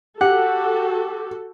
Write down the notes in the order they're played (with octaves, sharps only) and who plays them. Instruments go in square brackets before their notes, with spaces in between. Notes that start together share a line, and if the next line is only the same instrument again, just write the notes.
[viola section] F#4 A4 [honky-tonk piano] G4 [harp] F#5